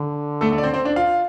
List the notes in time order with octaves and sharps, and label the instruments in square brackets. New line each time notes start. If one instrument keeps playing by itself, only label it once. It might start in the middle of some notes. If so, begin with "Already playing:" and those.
Already playing: [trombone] D3
[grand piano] A3 A4
A3 A4
D5
C4 C5
C4 C5
D4 D5
F4 F5